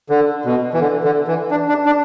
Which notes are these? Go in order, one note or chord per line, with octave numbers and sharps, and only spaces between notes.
D3
B2
E3
D3
D3
E3
D4
D4
D4